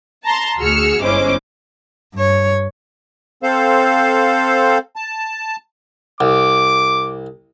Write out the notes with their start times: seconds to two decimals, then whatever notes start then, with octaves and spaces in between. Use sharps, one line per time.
0.24 A5 A#5 C6
0.58 D2 F#4 G#4 E6 F6 C#7
1.01 G1 G#3 C#4 E4 C5 D6
2.14 G2 C#5
3.43 C4 A4 C5 F5
4.96 A5
6.21 C2 D6